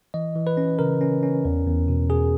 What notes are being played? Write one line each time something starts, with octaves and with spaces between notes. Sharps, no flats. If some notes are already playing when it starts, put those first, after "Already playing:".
E3 D#5
E3
B4
C#4
C#3 A#4
C#4
C#4
E2
E2
B2
B2 G#4